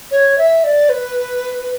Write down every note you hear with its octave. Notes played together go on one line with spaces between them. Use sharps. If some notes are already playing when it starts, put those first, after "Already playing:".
C#5
E5
D5
B4